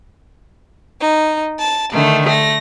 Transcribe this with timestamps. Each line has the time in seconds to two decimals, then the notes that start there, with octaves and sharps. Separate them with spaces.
1.02 D#4
1.59 A5
1.92 D3 D#3 A3
2.27 A3 A#6